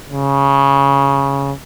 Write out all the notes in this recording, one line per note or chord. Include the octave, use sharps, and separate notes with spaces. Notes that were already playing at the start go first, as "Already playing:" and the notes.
C#3